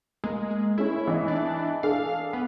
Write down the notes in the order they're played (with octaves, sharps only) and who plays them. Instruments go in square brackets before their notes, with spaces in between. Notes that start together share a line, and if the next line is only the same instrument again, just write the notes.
[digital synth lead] G#3 [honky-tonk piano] A#3
[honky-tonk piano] G#3 C#4 [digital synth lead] E4
[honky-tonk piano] E3 D#4
[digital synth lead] D4
[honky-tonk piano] D4 G#4 A4 [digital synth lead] F5
[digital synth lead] B3